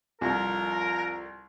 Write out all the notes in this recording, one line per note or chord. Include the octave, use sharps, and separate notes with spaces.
C2 F2 A#4